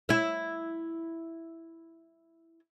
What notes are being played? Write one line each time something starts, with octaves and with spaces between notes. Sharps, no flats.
E4 E5